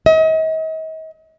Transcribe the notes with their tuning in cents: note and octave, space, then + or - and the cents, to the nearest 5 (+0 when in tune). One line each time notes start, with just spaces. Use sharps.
D#5 +40